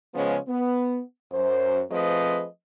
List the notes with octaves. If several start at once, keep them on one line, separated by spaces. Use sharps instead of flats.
C#3 F3 G#3 B3 C#4 C#5
B3
F#2 C5
F3 A3 C4 G#4 B4 D#5